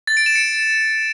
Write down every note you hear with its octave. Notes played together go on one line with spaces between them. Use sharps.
A6
D7
E7
C#7